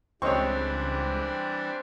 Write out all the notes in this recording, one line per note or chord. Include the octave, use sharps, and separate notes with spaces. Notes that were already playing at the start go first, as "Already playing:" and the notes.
C#2 E3 G3 C4 D4 C#5 D#5 C#6